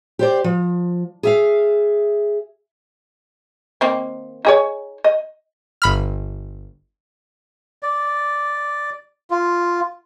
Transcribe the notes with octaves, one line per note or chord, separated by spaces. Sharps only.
G4 C5 D5
F3
G#4 E5 F5
D#3 A#3 C4
D#4 G#4 C#5
D#5
G1 B5 F6
D5
F4